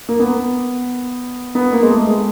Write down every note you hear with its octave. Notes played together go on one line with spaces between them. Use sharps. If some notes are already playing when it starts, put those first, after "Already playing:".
A#3
B3
B3
A#3
G#3
A3
G#3